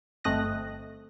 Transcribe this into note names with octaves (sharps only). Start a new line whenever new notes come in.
G1 A3 C4 D#5 F#6 A#6